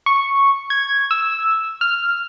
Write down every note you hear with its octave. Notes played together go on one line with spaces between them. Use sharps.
C#6
G#6
E6
F6